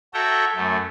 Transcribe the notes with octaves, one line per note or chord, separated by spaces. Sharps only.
F#4 A4 C#5 E5 G5 A#5
F#2 A3